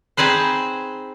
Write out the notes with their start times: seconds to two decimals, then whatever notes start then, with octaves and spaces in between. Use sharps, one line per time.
0.17 C4 D#4 G#4 B4 C5